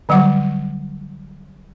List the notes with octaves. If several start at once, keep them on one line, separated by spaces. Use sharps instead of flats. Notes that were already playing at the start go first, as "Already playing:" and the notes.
D3 F#3 G3 F#5 D6